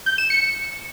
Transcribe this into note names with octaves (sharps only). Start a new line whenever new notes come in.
G6
E7
C#7